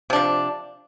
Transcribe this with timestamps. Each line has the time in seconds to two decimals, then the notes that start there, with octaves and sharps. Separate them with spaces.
0.10 C3
0.13 D4
0.16 F3